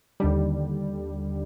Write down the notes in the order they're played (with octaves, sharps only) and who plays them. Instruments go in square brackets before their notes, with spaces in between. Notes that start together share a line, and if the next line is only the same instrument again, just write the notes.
[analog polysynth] D#2 D3 G3